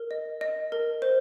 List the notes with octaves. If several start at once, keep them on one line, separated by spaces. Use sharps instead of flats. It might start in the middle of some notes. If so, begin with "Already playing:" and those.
Already playing: A#4
D#5
D#5
A#4
C5